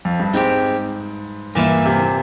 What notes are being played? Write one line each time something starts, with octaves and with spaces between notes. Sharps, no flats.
F2
G2
G#2 G#3 C4 G4
G2 A#2 E3 A#3 E4
C3